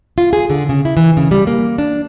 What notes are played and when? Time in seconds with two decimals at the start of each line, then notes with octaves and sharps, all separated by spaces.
0.18 F4
0.33 G#4
0.50 D3
0.69 C#3
0.85 E4
0.97 E3
1.17 C#3
1.31 G3
1.47 A#3
1.78 D4